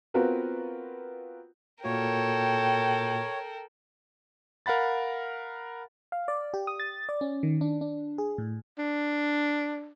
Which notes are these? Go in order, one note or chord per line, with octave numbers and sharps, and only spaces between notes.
B3 C4 F4 F#4 A#4 B4
A#2 A#3 F#4 A4 A#4 C#5 G5
A#4 F5 F#5 B5 A6
F5
D5
G4
D#6
A6
D5
C#4
D#3
D4
D4
G#4
A2
D4